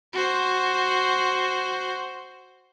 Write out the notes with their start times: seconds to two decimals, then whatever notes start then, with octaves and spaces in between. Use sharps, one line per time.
0.14 F#4 C5